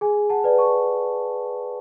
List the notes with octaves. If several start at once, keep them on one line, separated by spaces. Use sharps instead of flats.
G#4 G#5
F#5 A5
B4 D5
A5 C#6